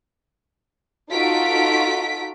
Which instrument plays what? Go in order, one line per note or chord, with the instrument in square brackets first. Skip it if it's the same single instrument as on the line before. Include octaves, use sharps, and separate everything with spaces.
[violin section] D#4 F4 F#4 A4 B6 D7